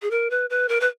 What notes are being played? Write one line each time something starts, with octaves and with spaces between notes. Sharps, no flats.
G#4
A#4
B4
B4
A#4
B4